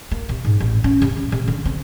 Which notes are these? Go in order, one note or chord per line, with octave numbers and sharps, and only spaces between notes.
A#3
C3
G#2
A1
C#4
C3
C3
C3
D3
C4